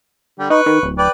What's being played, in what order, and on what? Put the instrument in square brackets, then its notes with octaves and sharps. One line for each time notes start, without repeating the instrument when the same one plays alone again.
[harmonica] D3 G3
[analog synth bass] D#4 [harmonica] B4 C#6
[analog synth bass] D#3
D1
[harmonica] B4 D5 G5